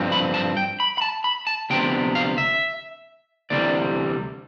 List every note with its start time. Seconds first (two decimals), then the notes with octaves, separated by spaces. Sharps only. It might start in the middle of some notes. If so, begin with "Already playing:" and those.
Already playing: G2 F3 C4
0.12 B5
0.34 A5
0.57 G5
0.80 B5
0.98 B5
1.02 A5
1.24 B5
1.47 A5
1.70 D2 C3 F3 B3 G5
2.15 F5
2.38 E5
3.50 D2 C3 E3 G3 D5